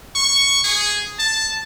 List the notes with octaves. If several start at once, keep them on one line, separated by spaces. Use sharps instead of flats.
C#6
G#4
A5